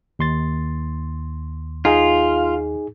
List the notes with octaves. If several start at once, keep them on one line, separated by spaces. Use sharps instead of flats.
D#2 C6 A6
D#4 F4 G#4